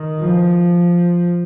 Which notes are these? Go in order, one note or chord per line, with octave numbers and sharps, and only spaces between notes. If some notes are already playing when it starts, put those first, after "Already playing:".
Already playing: D#3
F3